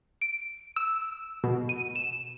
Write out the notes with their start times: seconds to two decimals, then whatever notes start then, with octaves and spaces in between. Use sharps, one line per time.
0.21 D7
0.76 E6
1.44 B2
1.69 D#7
1.96 E7